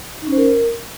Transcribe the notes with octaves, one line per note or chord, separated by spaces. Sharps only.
D#4
C#4
C5
A#4